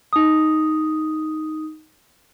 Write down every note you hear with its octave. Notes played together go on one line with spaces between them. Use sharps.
D#4 D#6